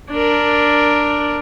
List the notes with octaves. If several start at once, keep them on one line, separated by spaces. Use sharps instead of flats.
D4 A#4